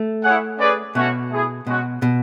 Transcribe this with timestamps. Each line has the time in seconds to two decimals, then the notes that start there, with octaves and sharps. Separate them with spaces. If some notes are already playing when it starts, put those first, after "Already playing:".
Already playing: A3
0.23 E4 G#4 C#5 F#5
0.58 C#4 G#4 B4 D5
0.95 B2 A3 C#4 F#4 C#5 F#5
1.30 A3 E4 G#4
1.67 B2 G#3 C#4 F#4
2.02 B2